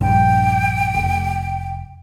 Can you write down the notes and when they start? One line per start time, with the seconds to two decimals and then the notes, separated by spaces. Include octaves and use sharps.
0.01 A#1 G2 G5
0.94 F1